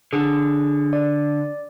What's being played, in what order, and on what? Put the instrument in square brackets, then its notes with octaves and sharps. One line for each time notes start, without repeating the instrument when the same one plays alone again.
[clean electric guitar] D3 [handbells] G#4
[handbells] D5